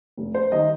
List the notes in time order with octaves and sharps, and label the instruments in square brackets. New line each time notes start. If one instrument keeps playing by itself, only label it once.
[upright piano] F1
C5
D#3 G3 D#5